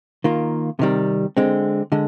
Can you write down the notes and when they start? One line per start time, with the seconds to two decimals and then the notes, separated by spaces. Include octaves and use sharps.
0.24 D#3 A#3 F4
0.79 C3 D#3 G3
1.37 D3 G#3 C4
1.92 D3 G#3